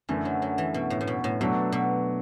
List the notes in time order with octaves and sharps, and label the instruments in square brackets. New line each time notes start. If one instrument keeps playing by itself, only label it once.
[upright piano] F#2 D3 A3 [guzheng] E3
[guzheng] F#3
F#3
E3
B2
A2
A2
B2
A2
[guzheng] B2 [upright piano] F#3 A3 D4 A4
[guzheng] B2